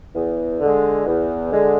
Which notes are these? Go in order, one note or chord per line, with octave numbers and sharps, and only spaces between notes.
E2
D3
G#3
E2
D3 G#3